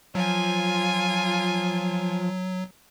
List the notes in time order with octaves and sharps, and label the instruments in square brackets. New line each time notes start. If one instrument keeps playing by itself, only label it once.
[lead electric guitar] F3 [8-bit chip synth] F#3 [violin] F4 G#5